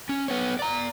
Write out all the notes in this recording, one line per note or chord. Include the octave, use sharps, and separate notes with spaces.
C#4
B3 C#5
D5 A#5